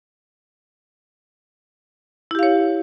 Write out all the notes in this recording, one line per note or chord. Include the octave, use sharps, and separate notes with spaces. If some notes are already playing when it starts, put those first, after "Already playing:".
E4 G4 C#5 F5